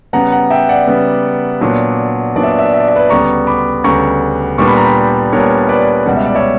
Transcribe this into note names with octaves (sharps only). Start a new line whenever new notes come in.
C#3 G3 B3 F#5 A#5
F#5 A#5
E5 G5
D5 F#5
C#3 G3 B3
A#2 F#3 B3 D4
A#2 F#3 B3 D4 D5
E5
D5
E5
D5
E5
D5
E5
B4 D5
D2 C#3 G3 B3 A#5 C#6
B5 D6
D2 C#3 G3 B3 A#5 C#6
A#2 G3 B3 D4 C#6
B5
A#5
G5 B5
A#2 G3 B3 D4 A#4 C#5
B4 D5
C#2 B2 G3 F#5
E5
D5
C#5 E5